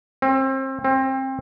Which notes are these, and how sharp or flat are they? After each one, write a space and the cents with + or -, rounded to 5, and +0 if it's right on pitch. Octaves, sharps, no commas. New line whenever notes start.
C4 +30
C4 +25